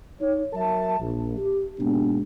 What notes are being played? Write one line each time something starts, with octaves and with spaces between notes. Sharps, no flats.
D#4 C#5
F#3 A#4 E5 A5
A#1
G4
G#2 B2 G#3 A#3 B3 D4